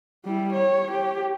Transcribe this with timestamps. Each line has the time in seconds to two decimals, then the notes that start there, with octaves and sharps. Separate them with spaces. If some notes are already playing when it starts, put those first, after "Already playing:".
0.24 G3 E4
0.53 C#5
0.91 G4